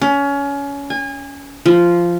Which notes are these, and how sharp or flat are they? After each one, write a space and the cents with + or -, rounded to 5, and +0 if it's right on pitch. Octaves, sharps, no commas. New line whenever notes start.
C#4 +25
G#5 -30
F3 -10